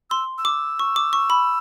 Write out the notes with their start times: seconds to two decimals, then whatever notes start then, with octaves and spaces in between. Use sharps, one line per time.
0.10 C6 E6
0.38 E6
0.45 D6
0.79 C#6
0.96 D6
1.13 C#6
1.30 B5